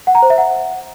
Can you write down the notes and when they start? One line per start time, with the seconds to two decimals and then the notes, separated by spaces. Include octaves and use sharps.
0.07 F#5
0.15 A#5
0.22 C5
0.30 E5
0.38 F#5